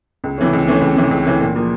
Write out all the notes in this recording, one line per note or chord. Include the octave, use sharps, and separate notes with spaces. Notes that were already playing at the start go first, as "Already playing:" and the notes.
C#2
C3 E3 A3 C#4
C#2
C3 E3 A3 C#4
C#2
C3 E3 A3 C#4
C#2
C3 E3 A3 C#4
A#2
F3 A#3